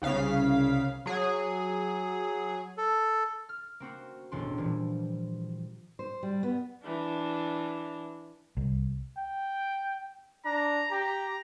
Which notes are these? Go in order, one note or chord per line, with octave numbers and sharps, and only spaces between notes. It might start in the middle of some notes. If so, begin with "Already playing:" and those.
C2 C#3 F5 B6
F#3 G#4
A4
F6
A#3 C4 F#4
E1 A1 D4 C6
A#2 E3 F3 G3
C5
G3
B3
E3 D4
C2
G5
D4 A#5
G4 A#5